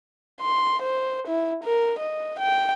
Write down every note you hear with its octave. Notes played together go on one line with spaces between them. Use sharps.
C6
C5
E4
A#4
D#5
G5